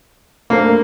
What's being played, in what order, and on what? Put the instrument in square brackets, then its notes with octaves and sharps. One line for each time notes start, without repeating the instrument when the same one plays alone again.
[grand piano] A3 D4 A4 C5 [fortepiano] A#3